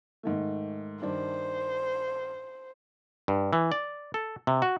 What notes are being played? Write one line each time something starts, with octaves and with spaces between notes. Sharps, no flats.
G#2 D#3 A3
G2 D#3 D4 C5
G2
E3
D5
A4
C3
F#4